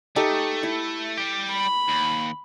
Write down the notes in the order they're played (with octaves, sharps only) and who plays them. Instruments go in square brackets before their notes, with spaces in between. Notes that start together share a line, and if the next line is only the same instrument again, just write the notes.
[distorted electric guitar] A3 [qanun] D#4 G4 A4
[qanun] E4
[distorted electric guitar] G3 G4
[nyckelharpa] B5
[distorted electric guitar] D#2